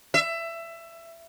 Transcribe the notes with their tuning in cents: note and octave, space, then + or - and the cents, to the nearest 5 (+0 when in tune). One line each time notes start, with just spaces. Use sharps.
E5 +20